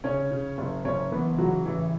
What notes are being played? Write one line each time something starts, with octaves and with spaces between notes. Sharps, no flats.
C#3 C#4 C#5
C#3
F#1
F#1 C#4 C#5
E3 B3 B4
C#3 F#3 F#4
A1 E3 E4